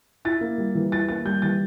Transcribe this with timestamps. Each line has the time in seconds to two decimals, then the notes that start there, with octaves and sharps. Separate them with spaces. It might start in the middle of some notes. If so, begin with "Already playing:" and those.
0.25 E4 A6
0.41 A#3
0.58 G3
0.75 E3
0.92 E4 A6
1.09 A#3 A6
1.25 G3 G6
1.42 E3 A6